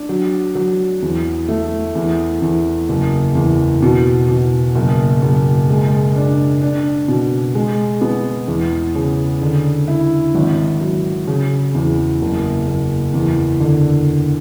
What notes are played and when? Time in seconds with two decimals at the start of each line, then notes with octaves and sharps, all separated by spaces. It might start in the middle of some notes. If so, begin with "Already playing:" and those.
Already playing: D4
0.09 F#3
0.55 F#3
1.02 E2
1.49 A3
1.95 E2
2.42 E2
2.89 F#1
3.35 E2
3.82 B2
4.29 B2
4.75 F#1
5.22 F#1
5.69 G#3
6.15 D4
6.61 D4
7.08 B2
7.55 G#3
8.01 B3
8.48 E2
8.95 C#3
9.42 D3
9.88 E4
10.35 G#1
10.81 F#3
11.27 C#3
11.75 E2
12.22 F#1
12.67 F#1
13.14 E2
13.60 D3